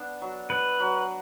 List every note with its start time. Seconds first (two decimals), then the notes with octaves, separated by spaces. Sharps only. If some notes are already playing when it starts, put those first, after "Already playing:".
Already playing: B3 D4
0.21 F#3
0.50 B3 B4
0.80 F#3